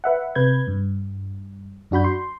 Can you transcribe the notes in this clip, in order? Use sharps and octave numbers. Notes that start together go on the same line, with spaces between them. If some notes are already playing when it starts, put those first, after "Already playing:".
B4 E5 F#5
C3 B4 G6 G#6
G2
F#2 D4 F#4 B5 G6
C6